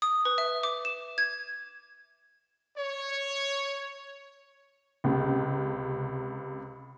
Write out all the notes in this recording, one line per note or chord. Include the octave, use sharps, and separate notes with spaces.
D#6
B4
E5
D6
E7
G#6
C#5
C#2 C3